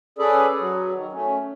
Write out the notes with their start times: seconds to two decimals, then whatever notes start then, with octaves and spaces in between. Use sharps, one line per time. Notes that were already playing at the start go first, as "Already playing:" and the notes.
0.18 C#4 G#4 A4 B4 D5
0.59 F#3
0.93 D#3
1.13 A3 C#4